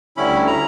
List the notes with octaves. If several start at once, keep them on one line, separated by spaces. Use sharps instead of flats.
D2 D3 G3 C#4 E4 B5
A#5